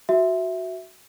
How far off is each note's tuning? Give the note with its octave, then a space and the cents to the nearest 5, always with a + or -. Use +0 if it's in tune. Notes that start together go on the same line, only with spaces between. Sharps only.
F#4 +0 E5 +0